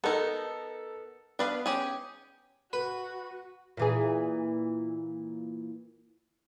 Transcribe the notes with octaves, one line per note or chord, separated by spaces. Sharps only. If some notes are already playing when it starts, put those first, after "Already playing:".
B3 D#4 A4 A#4
B3 D4 B4 F5
C#4 G4 G#4
F#4 B4
A#2 E3 G#4